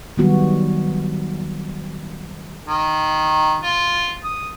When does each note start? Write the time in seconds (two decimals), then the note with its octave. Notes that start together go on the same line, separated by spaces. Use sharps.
0.17 D#3 F#3 G3 B3 F#4
2.67 D#3
3.64 F4
4.24 D#6